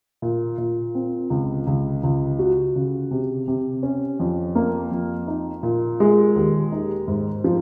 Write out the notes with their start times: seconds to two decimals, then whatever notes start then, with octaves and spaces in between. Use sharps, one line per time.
0.22 A#2
0.58 A#2
0.95 C4
1.30 C#2
1.67 C#2
2.03 C#2
2.39 F#4
2.76 C#3
3.11 C3
3.48 C3
3.83 C#4
4.20 F2
4.55 A#3
4.91 F2
5.27 D#4
5.63 A#2
6.00 G#3
6.36 D#2
6.72 D#4
7.08 G#2
7.44 F3